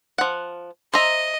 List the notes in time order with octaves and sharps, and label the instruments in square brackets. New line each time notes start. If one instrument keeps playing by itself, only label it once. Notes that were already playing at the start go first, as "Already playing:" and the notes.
[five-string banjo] F3 F#5
[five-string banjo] C5 E5 A#5 [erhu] D#5